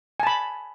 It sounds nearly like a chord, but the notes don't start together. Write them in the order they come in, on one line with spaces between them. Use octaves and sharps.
G#5 A5 B5